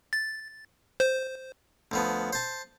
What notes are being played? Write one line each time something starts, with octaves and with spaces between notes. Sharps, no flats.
A6
C5
D2 F3 B3
C5 A5